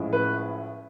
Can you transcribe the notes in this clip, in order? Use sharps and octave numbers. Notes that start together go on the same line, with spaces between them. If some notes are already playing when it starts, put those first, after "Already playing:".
Already playing: A1 A2 F3 G#3
B4